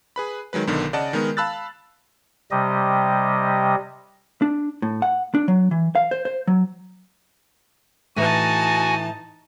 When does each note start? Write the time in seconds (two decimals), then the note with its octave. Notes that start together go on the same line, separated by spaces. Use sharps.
0.16 G#4 B4 B5
0.53 D#3 F#3 G#3 B4
0.67 B1 D3 D#3 B3
0.93 C#3 D5 D#5 F#5 A5
1.13 D#3 G#3 B3 A#4
1.37 F5 A5 B5 E6 F#6 A6
2.51 C3 G3 D#5
4.42 D4
4.82 A2
5.02 F#5
5.35 D4
5.48 F#3
5.71 E3
5.95 F5
6.11 C5
6.25 C5
6.47 F#3
8.16 A2 E3 D#4 F#4 B4 G#5 A5